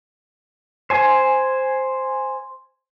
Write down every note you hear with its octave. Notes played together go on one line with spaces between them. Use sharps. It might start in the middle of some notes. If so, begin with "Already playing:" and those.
C5 G#5